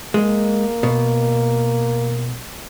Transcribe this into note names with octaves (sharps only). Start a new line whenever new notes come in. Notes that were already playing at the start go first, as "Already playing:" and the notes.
G#3 A#3
B2